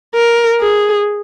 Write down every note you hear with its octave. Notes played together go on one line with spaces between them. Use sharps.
A#4
G#4